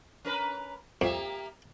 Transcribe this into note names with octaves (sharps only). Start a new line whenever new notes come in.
C#4 A#4 B4
F2 A#3 G4 E5